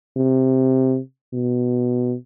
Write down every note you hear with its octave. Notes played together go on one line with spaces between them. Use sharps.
C3
B2